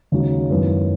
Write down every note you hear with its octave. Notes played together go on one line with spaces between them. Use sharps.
D#2 C#3 G#3 D#4 F#4
F#2 D#3 G#3 B3 E4